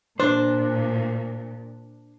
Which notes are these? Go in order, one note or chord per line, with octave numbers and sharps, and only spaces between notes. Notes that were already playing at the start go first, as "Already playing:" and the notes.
A#2 D4 C5